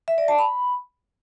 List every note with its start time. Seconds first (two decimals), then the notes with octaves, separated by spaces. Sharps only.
0.08 E5
0.18 D5
0.28 A5
0.39 B5